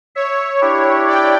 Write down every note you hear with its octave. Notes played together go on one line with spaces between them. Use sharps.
C#5 E5
D4 E4 G4
D5 G5